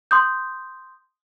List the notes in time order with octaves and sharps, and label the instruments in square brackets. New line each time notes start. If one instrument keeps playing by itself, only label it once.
[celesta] C6 D#6 G6